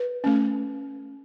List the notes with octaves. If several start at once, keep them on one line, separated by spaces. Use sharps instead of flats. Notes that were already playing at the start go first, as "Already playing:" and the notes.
Already playing: B4
A3 C#4